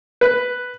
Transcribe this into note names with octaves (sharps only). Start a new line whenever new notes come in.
B4